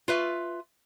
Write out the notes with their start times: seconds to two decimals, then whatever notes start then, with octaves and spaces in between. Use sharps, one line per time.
0.08 F4 B4 E5